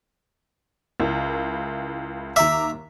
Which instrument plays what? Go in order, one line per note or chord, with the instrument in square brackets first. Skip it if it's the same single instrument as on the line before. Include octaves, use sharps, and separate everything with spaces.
[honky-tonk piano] C#2 E4 A#4
[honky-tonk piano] D#2 A#5 D6 [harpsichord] E5